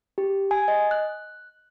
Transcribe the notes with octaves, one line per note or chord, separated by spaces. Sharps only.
G4
G#5
D#5
F#6